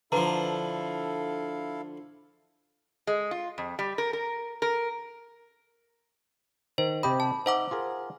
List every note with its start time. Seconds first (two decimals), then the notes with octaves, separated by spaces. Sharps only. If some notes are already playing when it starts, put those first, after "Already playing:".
0.12 D3 F3 E4 A4 B4 F5 A5 A#5
3.07 G#3
3.31 F4
3.58 F2
3.79 G3
3.98 A#4
4.13 A#4
4.62 A#4
6.78 D#3 C5
7.03 C3 G4 D#5 B5
7.20 A5
7.46 D#4 C5 E5 F#5 D6
7.71 F4 G#4 A#4